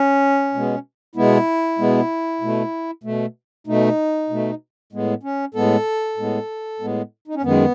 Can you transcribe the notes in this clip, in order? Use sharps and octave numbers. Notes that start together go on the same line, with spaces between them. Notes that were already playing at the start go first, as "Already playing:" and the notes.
Already playing: C#4
B2 G#3 B3
B2 G#3 B3 E4
B2 G#3 B3
B2 A3
B2 A3
B2 A3 D#4
B2 A3
A2 G#3 B3
C#4
A2 G#3 B3 A4
A2 G#3 B3
A2 G#3 B3
D#4
C#4
F#2 D#3 G#3 B3